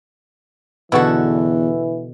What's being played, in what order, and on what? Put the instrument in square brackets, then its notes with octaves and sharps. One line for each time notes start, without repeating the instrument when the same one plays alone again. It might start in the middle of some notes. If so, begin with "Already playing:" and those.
[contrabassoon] E2 [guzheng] B2 D3 [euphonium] E3 [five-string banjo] E4 F#4 A4